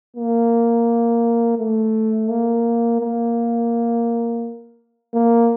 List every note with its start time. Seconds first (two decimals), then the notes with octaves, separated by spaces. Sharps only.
0.16 A#3
1.59 A3
2.30 A#3
3.01 A#3
5.14 A#3